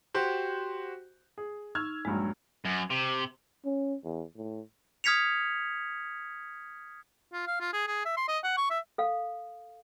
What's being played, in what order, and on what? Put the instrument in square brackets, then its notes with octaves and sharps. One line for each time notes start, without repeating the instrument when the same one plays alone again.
[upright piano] F#4 G4 C5
[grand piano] G#4
[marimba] D#4 C#6 [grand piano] E6 F6 G#6
[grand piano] A#1 G2 F#3 [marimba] G#3
[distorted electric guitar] F#2
C3
[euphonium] C#4
E2
A2
[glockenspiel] D#6 F6 G#6 B6 C#7 F7
[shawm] F4
F5
F4
G#4
G#4
E5
C6
D#5
F#5
C#6
E5
[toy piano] A4 F5